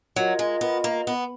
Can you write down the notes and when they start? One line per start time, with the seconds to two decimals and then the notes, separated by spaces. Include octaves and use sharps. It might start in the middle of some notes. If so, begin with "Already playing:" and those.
0.16 F#3 F4 A#4 D#5
0.39 G#3
0.61 B3
0.84 A#3
1.07 B3